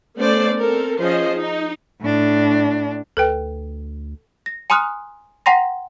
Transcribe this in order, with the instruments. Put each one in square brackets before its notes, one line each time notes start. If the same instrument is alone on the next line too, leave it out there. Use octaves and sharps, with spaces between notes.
[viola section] A3 B3 C#4 C5 D5
C4 A4 A#4
F3 C#4 G#4 C5 D#5
D#4
[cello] A2 D4
[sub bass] D2 [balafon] A4 B4 G5
[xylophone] A#6
G#5 A#5 C6 D#6 F6 F#6
F#5 G5 A#5 C6 A#6